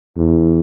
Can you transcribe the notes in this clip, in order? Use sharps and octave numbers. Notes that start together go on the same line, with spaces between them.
E2